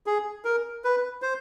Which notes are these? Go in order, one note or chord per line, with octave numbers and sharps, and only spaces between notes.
G#4
A#4
B4
C5